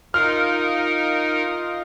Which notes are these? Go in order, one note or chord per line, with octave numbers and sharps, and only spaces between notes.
D#4 F4 A#4 D#5 F5 F6